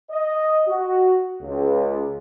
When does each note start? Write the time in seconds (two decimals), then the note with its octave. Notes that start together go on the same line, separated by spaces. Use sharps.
0.11 D#5
0.68 F#4
1.42 C#2